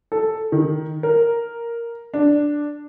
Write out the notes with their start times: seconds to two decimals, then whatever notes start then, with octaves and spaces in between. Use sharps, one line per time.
0.12 A4
0.52 D#3
1.03 A#4
2.14 D4